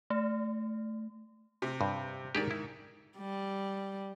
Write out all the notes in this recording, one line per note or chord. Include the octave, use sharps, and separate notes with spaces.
A3
C3
G2
G#2 D#3 G4 G#4 D5
E4
G3